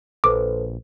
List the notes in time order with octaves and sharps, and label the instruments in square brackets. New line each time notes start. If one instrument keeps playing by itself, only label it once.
[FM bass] A#1 [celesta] A4 B4 C5 [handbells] D6